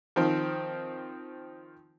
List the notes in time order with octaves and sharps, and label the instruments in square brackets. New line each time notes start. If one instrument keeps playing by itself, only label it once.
[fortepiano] D#3 F3 C4